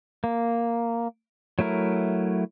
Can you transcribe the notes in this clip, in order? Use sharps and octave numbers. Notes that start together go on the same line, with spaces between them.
A#3
F#3 A3 E4 A#4